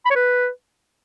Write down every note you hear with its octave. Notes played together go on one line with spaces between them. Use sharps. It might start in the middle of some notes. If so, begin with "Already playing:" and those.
B5
C#5
B4